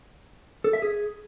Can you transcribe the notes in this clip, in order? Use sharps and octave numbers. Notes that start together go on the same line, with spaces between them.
A4
E5
G#4